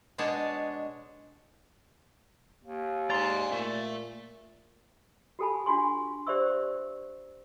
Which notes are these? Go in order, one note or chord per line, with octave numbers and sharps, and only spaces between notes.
B2 G#3 D4 C#5 A5
D#2
G#2 D5 G#5 A#5 C6
A#2 A3
F#4 G4 A4 G#5 A5 B5
D4 F4 F#4 G#5 C6 C#6
G4 C5 D5 E5 C#6 E6